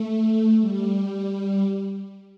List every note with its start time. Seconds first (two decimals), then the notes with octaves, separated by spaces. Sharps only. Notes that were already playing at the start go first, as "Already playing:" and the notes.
Already playing: A3
0.61 G3